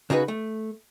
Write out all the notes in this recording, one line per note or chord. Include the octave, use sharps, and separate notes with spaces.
C#3 D#4 F#4 G#4 B4
A3